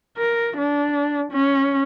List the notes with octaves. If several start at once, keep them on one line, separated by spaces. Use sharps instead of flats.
A#4
D4
C#4